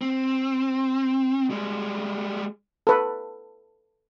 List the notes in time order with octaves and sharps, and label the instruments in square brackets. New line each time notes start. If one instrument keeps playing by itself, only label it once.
[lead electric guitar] C4
G3 G#3
[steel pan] A4 B4